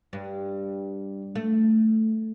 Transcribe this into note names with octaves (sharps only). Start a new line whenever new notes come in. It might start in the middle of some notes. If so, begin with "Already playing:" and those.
G2
A3